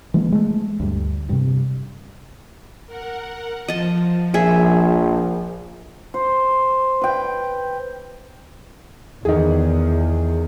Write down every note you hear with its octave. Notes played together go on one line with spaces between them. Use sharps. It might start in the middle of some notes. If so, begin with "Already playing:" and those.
E3 G#3 A#3
G#3 A3
D2 G2
G2 C3
A#4 F#5
F3 D#5 A5
A#1 G#4 E5
C5
B4 G5
E2 D#3 G#4